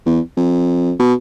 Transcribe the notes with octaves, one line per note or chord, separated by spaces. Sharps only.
E2
F2
B2